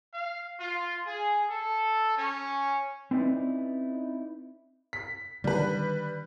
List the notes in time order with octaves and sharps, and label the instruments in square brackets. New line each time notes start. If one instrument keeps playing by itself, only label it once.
[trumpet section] F5
F4
G#4
A4
C#4
[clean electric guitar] C4 C#4 D#4 E4 B4 D5
[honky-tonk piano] B6
[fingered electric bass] D3 D#3 [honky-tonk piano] G3 B4